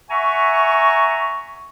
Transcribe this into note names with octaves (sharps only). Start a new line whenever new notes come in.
E5 F#5 G#5 A#5 C#6